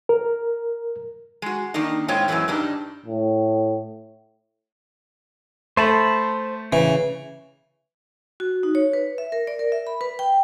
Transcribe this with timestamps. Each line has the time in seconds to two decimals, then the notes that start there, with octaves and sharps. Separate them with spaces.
0.09 A#4
1.42 G#3 F#4
1.74 D#3 A#3 D4 D#4
2.08 A2 G#3 C4 F4 C#5 G5
2.28 F#2 A#2 E3 G#3 C4 C#4
2.48 G2 G3 D4 D#4
3.06 A2
5.77 A3 C5 A5 B5
6.73 C#3 E3
8.40 F#4
8.63 D#4
8.75 C#5
8.93 B4
9.18 E5
9.32 A#4
9.47 D5
9.59 A#4
9.72 E5
9.87 B5
10.01 B4
10.19 G5